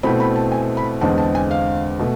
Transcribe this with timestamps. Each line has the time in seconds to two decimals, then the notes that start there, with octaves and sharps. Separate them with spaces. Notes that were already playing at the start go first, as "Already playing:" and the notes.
0.03 B2 A3 C4 E4 B5
0.20 B5
0.36 A5
0.52 G#5
0.77 B5
1.01 E2 D3 G#3 C4 A5
1.18 A5
1.35 G#5
1.51 F5
1.99 B2 A3